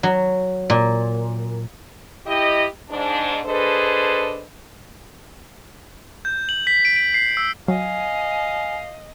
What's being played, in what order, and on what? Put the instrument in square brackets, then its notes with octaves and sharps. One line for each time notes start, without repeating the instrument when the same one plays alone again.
[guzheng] F#3
A#2
[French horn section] E4 G4 D#5
G#2 D4
D4 G#4 A4 B4 C5 D#5
[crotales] G6
F#7
B6
D7
D7
C7
E6
[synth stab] F#3 [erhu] D#5 [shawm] F5 [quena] G#5